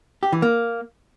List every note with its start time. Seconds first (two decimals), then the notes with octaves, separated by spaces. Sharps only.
0.23 G4
0.32 E3
0.42 A#3